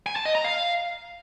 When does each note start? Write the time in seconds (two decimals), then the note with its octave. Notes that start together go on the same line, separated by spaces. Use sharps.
0.06 G#5
0.16 A5
0.25 D#5
0.35 A#5
0.44 F5